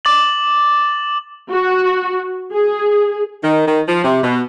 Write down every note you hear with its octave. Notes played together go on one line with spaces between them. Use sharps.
D6 A6 F#7
F#4
G#4
D#3
D#3
F3
C3
B2